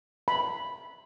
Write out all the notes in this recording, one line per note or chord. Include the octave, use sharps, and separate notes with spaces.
B5